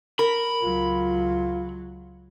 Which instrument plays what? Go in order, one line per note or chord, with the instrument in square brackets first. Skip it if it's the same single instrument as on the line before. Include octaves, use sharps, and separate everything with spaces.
[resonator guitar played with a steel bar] A#4 [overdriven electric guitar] B5
[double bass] C#2 F#3 [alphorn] F4